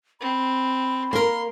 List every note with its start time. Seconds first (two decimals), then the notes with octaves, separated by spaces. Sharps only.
0.21 C4 B5
1.13 A#3 A#4 C6